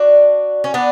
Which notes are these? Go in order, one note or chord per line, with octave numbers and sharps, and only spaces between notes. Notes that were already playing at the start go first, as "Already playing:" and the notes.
Already playing: D4 F#4
C#4
B3 D4